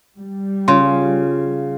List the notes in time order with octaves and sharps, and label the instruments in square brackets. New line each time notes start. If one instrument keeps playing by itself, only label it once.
[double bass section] G3
[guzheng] C#3 [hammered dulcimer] F4 [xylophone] C6